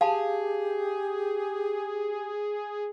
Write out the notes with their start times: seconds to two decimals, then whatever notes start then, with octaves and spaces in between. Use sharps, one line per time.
0.01 G4 G#4 F5 A5 B5